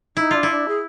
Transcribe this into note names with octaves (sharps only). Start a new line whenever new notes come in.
D#4 E4
D4 F4
E4
D4
G#4